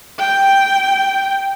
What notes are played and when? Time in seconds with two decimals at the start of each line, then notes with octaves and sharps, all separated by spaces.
0.19 G5